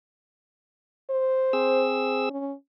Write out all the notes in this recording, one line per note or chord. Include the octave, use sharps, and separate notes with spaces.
C5
C4 G#4 E6
C#4